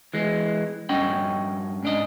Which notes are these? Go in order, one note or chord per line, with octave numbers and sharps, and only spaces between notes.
E3 G#3
G2 C#4 D#5 F#5 G5
G#2 D4 D#5